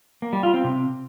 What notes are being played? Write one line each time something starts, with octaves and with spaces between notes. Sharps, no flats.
A#3
G3
F4
C4
C3